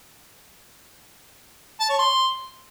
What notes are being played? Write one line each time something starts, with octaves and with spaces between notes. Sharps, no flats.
A5
C#5
C6